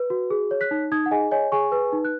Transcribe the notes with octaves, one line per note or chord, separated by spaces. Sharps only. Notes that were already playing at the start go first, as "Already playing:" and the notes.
Already playing: B4
F#4
G#4
C#5
F#6 B6
D#4
D#4 D#6 G#6
F#5
G#4 D#5 G#5
C#5 D#5 G#5
G#4 G#5 C#6
B4
D#4
F#6